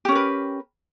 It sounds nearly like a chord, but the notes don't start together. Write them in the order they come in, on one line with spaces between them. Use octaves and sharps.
G4 C#4 A#4 B4